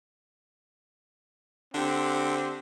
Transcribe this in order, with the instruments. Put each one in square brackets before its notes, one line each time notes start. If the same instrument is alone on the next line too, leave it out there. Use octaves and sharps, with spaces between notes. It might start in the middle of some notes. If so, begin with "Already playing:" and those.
[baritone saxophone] D3 [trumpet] C4 [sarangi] G4